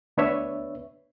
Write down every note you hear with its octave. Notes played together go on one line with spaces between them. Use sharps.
D2 B3 D4 B4 C#5 E5